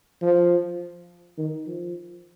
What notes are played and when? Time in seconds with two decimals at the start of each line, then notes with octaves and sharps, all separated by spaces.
0.22 F3
1.38 D#3
1.67 F3